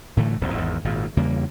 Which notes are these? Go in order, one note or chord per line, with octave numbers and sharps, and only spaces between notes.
A2 D3 E3 A3
D#1 C2
G#1 E2
G#1 A#2
E2 C#3 G3 A#3